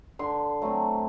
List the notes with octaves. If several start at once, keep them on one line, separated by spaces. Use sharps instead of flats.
D3 C6
F#3 A3 C4